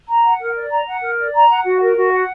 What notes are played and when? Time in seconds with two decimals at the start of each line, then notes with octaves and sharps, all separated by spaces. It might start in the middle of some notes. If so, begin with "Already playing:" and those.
0.08 A#5
0.24 F#5
0.40 A#4
0.56 D5
0.71 A#5
0.87 F#5
1.02 A#4
1.18 D5
1.34 A#5
1.49 F#5
1.65 F#4
1.81 A#4
1.96 F#4
2.12 F#5